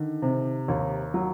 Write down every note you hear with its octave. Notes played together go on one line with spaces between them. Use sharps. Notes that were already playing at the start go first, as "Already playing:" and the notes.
Already playing: D3 D#3
C3
D#2
F#3